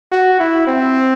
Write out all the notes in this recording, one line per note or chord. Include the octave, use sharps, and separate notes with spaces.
F#4
E4
C4